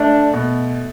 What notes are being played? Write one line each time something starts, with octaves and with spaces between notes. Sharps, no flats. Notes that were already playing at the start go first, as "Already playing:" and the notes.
Already playing: A3 D4
B2